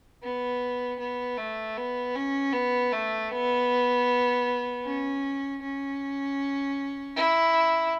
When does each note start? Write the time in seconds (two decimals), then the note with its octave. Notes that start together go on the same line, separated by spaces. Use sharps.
0.22 B3
0.99 B3
1.37 A3
1.77 B3
2.15 C#4
2.53 B3
2.92 A3
3.30 B3
4.84 C#4
5.62 C#4
7.16 E4